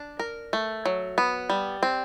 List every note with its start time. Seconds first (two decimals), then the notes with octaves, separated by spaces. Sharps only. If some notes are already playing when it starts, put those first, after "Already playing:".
Already playing: D4
0.20 A#4
0.53 A3
0.86 F#3
1.18 B3
1.50 G3
1.83 C4